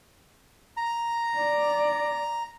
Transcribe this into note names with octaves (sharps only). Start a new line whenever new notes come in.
A#5
D5